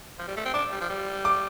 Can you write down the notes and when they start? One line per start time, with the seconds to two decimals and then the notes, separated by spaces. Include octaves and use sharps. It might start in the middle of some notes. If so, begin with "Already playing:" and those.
0.19 F3
0.28 G3
0.36 A3
0.45 C4
0.54 D4 D6
0.71 G3
0.80 F3
0.90 G3
1.25 D6